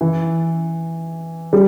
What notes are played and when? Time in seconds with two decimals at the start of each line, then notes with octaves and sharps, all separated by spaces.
0.01 E3
1.53 G3